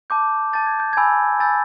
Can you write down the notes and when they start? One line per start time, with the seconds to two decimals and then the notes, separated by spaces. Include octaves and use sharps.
0.10 A5 D6 G6
0.53 A5 D6 G6 A6
0.66 G#6
0.80 G6
0.93 G#5 B5 E6 G6 G#6
1.40 G#5 B5 E6 G6 A6